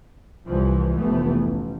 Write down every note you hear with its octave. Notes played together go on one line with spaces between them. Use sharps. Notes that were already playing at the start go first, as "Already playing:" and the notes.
C2 E3 F3
F1 E3 A3 B3
A1